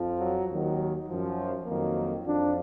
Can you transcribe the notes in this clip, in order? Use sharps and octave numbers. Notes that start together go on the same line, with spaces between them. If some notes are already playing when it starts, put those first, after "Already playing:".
Already playing: F2 F3
F#3
D#2 D#3 F#3
F#2 F3
F2 D#3 F#3 A#3
F2 F3 D4